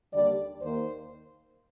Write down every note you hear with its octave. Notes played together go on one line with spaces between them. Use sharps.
D#2 D3 G3 D5
D#2 D#3 A#3 C5